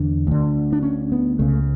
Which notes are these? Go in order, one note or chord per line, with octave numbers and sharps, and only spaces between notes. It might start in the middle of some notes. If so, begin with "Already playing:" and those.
Already playing: E2 D3 D4
D2 D3
D4
C#4
B3
C#2 C#3 A3